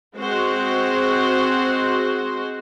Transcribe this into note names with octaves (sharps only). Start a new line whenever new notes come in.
G#3 C4 F#4 C5